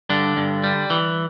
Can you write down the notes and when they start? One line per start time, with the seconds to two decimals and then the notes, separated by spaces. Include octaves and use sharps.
0.09 G2 D3 D4
0.37 G2
0.64 G3
0.90 E3